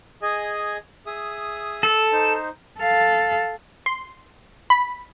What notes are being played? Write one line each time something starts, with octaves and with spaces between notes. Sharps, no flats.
G#4 D#5 G#5
G#4 E5 D#6
A4
D#4 C5
A4 F5
C6
B5